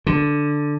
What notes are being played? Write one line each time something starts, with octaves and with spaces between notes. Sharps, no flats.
D3